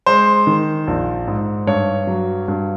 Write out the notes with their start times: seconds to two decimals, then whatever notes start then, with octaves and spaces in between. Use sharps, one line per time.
0.06 G#3 C5
0.47 D#3
0.87 A#1
1.28 G#2
1.67 G2 C#5
2.07 F#3
2.48 G2